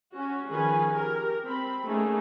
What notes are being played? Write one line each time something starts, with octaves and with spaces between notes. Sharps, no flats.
C#4 F#4
D#3 F3 C#4 G#4 B4 G#5
G4 A#4
C4 B5
A3 A#3 C#4 D#4 G#4